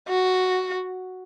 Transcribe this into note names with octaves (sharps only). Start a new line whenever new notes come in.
F#4